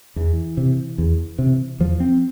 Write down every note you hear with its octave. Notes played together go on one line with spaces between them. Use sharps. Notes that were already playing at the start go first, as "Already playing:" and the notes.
E2 E3
C3
E2
C3
E2 F3
C4